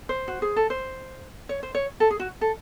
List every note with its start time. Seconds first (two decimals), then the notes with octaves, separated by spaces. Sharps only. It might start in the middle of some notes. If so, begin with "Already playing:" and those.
0.09 C5
0.28 F#4
0.42 G#4
0.56 A4
0.70 C5
1.49 C#5
1.63 C5
1.75 C#5
2.00 A4
2.11 G#4
2.19 F#4
2.41 A4